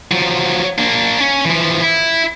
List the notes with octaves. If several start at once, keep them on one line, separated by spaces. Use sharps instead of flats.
F3 F#3
A#3 D4
C#4
E3 F3
E4